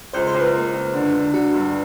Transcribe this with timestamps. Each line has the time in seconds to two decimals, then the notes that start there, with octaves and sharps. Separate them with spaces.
0.13 C#2 C5
0.27 C5
0.34 C#2
0.40 B4
0.53 A#3
0.73 C#2
0.94 D3
1.14 D3
1.34 D3 F#4
1.54 G2